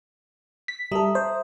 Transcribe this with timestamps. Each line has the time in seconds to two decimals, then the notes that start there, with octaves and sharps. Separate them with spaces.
0.68 B6
0.92 G3 A4 E5 A#5 D#6
1.15 C5